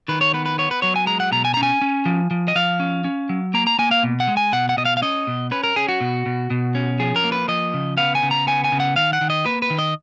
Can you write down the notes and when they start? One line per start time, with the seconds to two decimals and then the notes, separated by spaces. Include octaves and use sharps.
0.08 D#3 B4
0.21 C#5
0.34 B3 B4
0.46 B4
0.58 B3 C#5
0.71 B4
0.82 F#3 C#5
0.96 G#5
1.07 G#3 A#5
1.20 F#5
1.32 B2 A#5
1.45 G#5
1.54 C#4 A#5
1.63 G#5
1.81 C#4
2.05 F3
2.31 F3
2.48 D#5
2.55 F3 F5
2.80 C#4
3.04 C#4
3.29 F#3
3.54 A#3 A#5
3.67 A#5
3.79 A#3 G#5
3.91 F5
4.03 B2
4.20 F#5
4.27 G#3
4.37 G#5
4.52 B2 F#5
4.69 F#5
4.77 B2 D#5
4.85 F5
4.97 F5
5.02 C#4 D#5
5.27 B2
5.51 C#4 B4
5.64 A#4
5.76 C#4 G#4
5.88 F#4
6.01 B2
6.26 B2
6.50 B2
6.75 C#4
7.00 F3 G#4
7.16 A#4
7.24 A#3
7.32 B4
7.48 F3 D#5
7.74 C#3
7.97 B3 F5
8.15 G#5
8.23 C#3
8.31 A#5
8.47 B3 G#5
8.64 G#5
8.72 C#3
8.80 F#5
8.96 D#3 F5
9.13 F#5
9.21 D#3
9.30 D#5
9.46 A#3 B4
9.62 B4
9.70 D#3
9.79 D#5